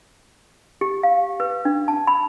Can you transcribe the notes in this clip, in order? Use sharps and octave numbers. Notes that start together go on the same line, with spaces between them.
G4
F5
B4
D4
A5
B5